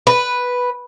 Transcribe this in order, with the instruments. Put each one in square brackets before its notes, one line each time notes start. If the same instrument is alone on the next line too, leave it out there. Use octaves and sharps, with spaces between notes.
[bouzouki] B4